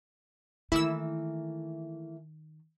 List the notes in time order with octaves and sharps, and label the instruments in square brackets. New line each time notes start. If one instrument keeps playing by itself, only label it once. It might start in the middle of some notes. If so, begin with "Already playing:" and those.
[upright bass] D#3 [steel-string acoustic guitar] E3 A3 A#3 [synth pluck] E4 E6